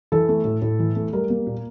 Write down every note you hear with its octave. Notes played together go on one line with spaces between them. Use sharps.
E3 A4
A3
A2
A2
E3
A3
G3 A#4
A#3
A#2